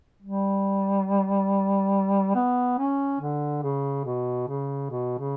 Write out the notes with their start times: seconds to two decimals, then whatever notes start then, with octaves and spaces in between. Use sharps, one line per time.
0.22 G3
2.35 B3
2.78 C#4
3.20 D3
3.63 C#3
4.05 B2
4.48 C#3
4.91 B2
5.18 C#3